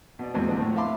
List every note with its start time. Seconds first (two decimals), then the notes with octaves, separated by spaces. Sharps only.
0.19 B2 D5
0.34 E2 A#2 F#3 G#3 C4
0.47 D#2 D3 F3 C4
0.60 A2
0.76 E5 F5 A5 B5 C6 D6